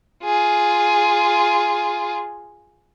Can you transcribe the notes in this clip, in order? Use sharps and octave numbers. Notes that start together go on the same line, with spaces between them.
F4 G#4